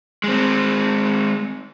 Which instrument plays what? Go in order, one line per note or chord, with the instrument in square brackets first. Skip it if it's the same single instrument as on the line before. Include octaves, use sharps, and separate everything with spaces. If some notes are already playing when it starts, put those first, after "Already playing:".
[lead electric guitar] G#3 C4